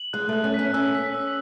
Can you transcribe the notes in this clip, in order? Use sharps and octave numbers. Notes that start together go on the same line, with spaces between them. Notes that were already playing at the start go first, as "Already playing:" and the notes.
Already playing: F#7
G#3 F#6
A3 F#6
C#4
C#4 B6
C#4 E6
B6
E6